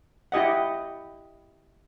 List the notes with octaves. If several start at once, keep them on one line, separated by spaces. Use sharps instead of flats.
E4 G4 D#5 F#5